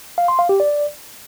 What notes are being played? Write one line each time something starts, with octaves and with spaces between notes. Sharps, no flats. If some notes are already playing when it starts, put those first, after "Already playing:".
F5
C6
F5
G4
D5